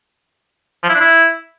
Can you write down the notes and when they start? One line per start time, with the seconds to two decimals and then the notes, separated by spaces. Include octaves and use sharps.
0.83 F3
0.89 E4
0.95 D4
1.00 E4